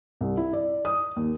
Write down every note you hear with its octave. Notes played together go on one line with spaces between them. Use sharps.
C2
E4
D5
D#6
D#2